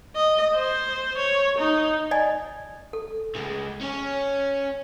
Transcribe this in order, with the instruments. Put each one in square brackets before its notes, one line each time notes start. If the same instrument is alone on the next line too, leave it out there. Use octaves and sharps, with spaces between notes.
[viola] D#5
C5
C#5
D#4
[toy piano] D5 D#5 G#5
A4
[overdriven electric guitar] C#2 G#3
C#4 C#5